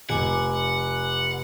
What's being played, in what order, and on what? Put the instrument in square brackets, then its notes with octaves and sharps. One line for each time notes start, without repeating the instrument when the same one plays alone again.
[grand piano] F1 [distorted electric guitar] F#5 [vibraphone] G#5 D6